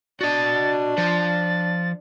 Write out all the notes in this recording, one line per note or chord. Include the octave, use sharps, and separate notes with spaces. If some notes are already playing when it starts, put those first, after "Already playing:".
D4 F#4 D#5 A6
F3 C5 A6